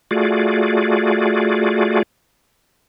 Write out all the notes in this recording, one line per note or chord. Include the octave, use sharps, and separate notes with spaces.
A3 F4 F#4 G#4 D5